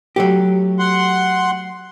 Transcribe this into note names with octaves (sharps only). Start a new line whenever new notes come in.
F#3 A3 G4
F#5 C6